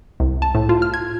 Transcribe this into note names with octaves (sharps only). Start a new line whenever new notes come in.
C2
A5
A2
F4
F6
G#6